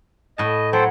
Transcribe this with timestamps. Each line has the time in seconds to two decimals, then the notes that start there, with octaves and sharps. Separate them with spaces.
0.38 A2 D#5 A5
0.73 F#3 A4 C5 G5